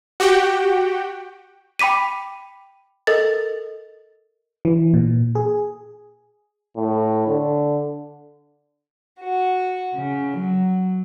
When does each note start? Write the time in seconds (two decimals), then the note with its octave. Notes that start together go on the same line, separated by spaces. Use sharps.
0.20 F#4 G4 F#5 G5
1.79 G5 B5 D6 B6 D#7
3.07 A4 A#4 D#5 A6
4.65 E3
4.94 A#2
5.35 G#4
6.76 A2
7.27 D3
9.18 F#4
9.95 C#3
10.39 F#3